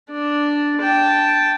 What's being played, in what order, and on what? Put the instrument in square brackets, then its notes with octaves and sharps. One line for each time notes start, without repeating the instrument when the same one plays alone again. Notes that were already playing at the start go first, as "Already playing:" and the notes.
[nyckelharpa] D4
G5 A5